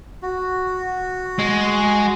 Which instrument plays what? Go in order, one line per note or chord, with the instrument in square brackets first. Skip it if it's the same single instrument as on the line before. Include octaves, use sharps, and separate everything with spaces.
[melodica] F#4
[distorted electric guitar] G#3